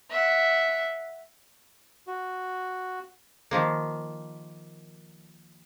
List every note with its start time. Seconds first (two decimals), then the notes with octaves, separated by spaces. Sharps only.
0.11 E5 F#5
2.07 F#4
3.51 D#3 F3 A#3